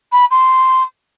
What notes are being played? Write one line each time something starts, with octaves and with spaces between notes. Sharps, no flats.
B5
C6